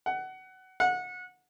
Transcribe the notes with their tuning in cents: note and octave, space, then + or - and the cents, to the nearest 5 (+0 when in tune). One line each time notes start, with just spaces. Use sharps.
F#5 +20
F#5 -25